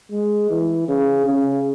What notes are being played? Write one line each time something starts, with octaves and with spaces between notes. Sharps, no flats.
G#3
E3
C#3
C#3